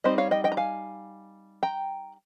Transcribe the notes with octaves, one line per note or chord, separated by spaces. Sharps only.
G3 C4 D#4 C5 D#5
C#5 F5
D#5 G5
D#5 G5
A#5
F5 G#5
G5 A#5